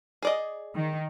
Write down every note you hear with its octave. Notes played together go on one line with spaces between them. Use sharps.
G#4 D5 D#5
D#3